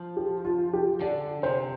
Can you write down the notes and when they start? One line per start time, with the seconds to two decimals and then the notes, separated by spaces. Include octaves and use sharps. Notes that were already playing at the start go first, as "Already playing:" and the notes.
Already playing: F3
0.17 G4
0.45 F4
0.73 G4
1.01 D3 D5
1.43 C3 C5